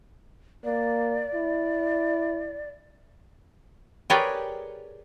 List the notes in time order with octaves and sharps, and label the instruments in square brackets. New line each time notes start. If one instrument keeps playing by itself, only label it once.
[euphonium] A#3 [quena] D5
[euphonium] E4
[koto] G4 G#4 A#4 B4 C#5 D5